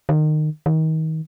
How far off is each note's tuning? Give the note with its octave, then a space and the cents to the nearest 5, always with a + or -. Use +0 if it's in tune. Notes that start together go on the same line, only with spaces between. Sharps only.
D#3 -25
D#3 +30